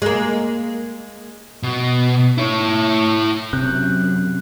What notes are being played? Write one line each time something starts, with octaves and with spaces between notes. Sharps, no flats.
G#3 A#3
B2
E4 C#5
F#2 C3 F#6 G6